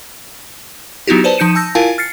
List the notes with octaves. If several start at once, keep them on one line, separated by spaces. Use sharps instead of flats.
F#3 B3 D#4 E4 F#4 G4
B4 C5 D5 A5
F3 D#4 G6 C#7 D#7 E7
A5 E6 G6 A#6
E4 F4 A#4 F5 G#5 A5
F6 A6 C7 C#7